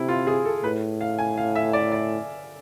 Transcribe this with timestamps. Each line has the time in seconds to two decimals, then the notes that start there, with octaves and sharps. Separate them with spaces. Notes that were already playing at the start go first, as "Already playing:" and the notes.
Already playing: C3 E4
0.09 F4
0.27 G#4
0.45 A4
0.64 A2 B4
1.01 F5
1.19 G#5
1.38 F5
1.55 E5
1.73 D5
1.92 D5